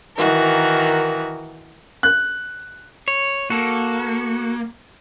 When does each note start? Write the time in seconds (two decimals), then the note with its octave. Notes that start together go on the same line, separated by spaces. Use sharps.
0.16 D#3 E3 F#4 A#4
2.03 F#6
3.08 C#5
3.50 A#3 F#4 A4